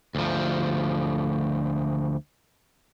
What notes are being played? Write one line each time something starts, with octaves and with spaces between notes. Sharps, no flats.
D2 F3